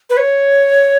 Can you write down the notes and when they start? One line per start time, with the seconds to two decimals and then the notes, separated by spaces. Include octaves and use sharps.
0.10 B4
0.17 C#5